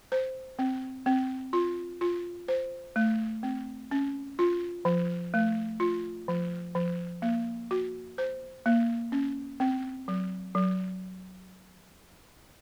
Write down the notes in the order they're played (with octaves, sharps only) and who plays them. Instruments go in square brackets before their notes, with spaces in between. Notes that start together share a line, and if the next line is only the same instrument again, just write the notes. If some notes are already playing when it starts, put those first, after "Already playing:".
[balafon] C5
C4
C4
F4
F4
C5
A3
C4
C#4
F4
F3
A3
F4
F3
F3
A#3
F#4
C5
A#3
C#4
C4
F#3
F#3